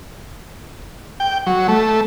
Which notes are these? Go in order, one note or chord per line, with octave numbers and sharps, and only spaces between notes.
G5
F#3
A3